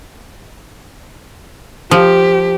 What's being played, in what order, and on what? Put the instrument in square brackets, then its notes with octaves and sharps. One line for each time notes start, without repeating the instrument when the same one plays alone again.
[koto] F3 [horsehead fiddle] G4